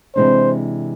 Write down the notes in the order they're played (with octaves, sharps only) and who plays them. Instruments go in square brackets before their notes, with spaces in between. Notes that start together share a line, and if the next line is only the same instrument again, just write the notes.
[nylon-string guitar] C3 E3 G#3 D4 [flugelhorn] C5